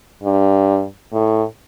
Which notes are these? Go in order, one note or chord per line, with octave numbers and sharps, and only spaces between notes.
G2
A2